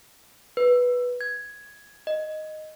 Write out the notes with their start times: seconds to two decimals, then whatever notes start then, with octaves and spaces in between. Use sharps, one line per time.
0.57 B4
1.21 G#6
2.07 D#5